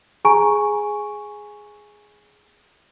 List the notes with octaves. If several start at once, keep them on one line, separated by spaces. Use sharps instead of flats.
G#4 G#5 A#5 C#6 D7